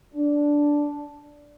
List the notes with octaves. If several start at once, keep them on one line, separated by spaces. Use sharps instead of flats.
D4